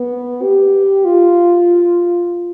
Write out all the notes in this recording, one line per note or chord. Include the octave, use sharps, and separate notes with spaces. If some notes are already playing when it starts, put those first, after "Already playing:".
Already playing: B3
G4
F4